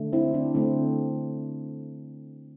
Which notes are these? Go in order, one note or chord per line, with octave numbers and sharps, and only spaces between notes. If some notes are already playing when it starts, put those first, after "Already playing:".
Already playing: D3 A3
C4 E4
D4
D3 A3 C4